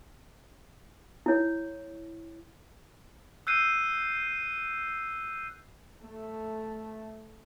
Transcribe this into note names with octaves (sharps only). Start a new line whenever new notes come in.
E4 C#5
E6 F#6 G6 C7 D#7
A3